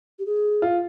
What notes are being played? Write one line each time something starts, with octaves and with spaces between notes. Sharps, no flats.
G4
G#4
F4